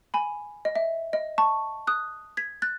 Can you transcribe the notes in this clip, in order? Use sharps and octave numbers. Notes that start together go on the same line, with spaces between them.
G#5 B5
D#5
E5
D#5
A5 C#6
D#6 F#6
G#6 B6
F#6 A6